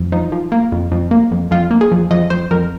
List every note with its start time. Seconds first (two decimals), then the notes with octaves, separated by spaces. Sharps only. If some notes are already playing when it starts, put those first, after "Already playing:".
Already playing: F2
0.12 F3 D#4
0.32 F3
0.52 A#3
0.72 F2
0.92 F2
1.11 A#3
1.31 F2
1.51 F2 F4
1.71 A#3
1.81 G#4
1.91 F2
2.11 F2 D#5
2.30 F2 C5
2.51 F2 A#4